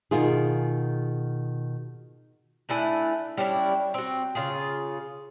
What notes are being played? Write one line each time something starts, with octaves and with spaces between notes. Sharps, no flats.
B2 D#3 F4 G#4
A3 D4 E4 G#5
G3 C#4 D4 E4
C4 F#4
C#3 F4 G#4